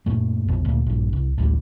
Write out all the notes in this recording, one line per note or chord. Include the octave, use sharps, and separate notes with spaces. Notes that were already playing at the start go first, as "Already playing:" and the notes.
F#2 A#2 A3
A#1 F2 B2
D2 A#2
A#1 G2
C2
A1 D2 A2 G3